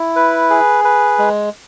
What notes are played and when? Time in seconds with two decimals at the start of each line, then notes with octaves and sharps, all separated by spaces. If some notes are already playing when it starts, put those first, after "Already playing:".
Already playing: E4
0.16 B4
0.50 G#4
0.84 B4
1.19 G#3